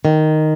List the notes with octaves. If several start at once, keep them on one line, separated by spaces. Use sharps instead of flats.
D#3